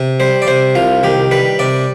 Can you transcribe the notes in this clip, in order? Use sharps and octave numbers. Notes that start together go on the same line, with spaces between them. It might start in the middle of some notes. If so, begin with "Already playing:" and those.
Already playing: C3
G3 C5
D5
C3 C5
C2 F4
D#3 G4
G3 B4
C3 D5